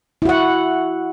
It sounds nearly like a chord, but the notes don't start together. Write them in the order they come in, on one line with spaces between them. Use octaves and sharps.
E4 F#4 F#5